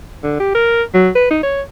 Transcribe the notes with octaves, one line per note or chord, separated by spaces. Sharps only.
D3
G4
A#4
F#3
B4
D#4
C#5